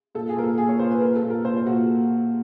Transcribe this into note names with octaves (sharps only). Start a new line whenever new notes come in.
A#2 A4
G#4
A#2 A#4
A4
A#2 G#4
C#5
A#2 C5
B4
A#2 A#4
A4
A#2
A#4
A#2 C5
C5
A#2 F#4